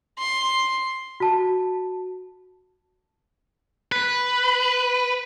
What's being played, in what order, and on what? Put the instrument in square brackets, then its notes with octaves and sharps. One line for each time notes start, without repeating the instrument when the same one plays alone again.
[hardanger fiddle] C6
[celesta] F#4 A5
[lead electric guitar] B4